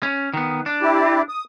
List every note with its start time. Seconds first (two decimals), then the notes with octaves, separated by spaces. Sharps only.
0.03 C#4
0.34 D#3 B3
0.66 D4
0.82 E4 G4
1.29 D#6